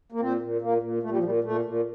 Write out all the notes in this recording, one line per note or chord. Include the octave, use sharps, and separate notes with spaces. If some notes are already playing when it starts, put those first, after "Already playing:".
A#3
A#2 C4
A#2
A#2 A#3
A#2
A#2 A3
G3
F3
A#2 G3
A#2 A3
A#2